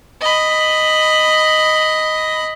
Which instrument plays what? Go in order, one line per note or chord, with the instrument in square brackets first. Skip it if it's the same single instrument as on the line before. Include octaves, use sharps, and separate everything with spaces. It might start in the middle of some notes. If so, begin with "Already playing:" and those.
[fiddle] D#5 B5